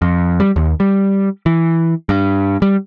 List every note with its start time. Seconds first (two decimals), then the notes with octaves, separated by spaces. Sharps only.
0.02 F2
0.40 G3
0.56 D#2
0.80 G3
1.46 E3
2.09 G2
2.62 G3